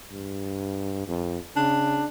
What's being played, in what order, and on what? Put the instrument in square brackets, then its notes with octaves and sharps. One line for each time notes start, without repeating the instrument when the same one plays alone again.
[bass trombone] G2
F2
[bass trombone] C#3 [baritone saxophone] D4